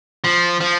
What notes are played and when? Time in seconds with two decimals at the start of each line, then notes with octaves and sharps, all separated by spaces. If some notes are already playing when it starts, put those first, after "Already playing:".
0.24 F3
0.60 F3